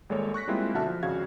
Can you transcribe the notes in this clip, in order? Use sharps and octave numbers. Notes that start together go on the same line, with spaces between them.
G#1 G3 G#3 A#3 A4 C#5
C#6 F#6 A#6 B6
G3 G#3 A#3 C4 E4 F4
B1 D3 F#4 E5 A5 F6
F3
G#1 F2 C#3 F#4 F5 G#6